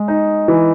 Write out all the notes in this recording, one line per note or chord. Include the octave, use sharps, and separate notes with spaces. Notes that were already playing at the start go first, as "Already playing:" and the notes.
Already playing: G#3
D#4
E3